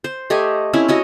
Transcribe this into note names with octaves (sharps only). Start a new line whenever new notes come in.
C5
A3 G4 D#5 G#5
C4 C#4 E4
C#4 F#4 D#5